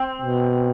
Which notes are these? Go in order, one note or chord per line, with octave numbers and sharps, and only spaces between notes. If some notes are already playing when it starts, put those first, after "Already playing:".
Already playing: C4
B2